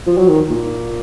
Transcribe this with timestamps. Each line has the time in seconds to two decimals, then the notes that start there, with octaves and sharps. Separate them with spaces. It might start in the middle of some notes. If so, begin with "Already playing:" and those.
0.07 F3
0.18 F#3
0.29 D#3
0.50 A#2